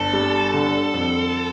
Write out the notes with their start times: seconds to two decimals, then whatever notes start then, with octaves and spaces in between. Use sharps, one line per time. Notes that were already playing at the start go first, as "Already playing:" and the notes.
Already playing: G1 A4
0.13 G3
0.54 D3
0.94 F2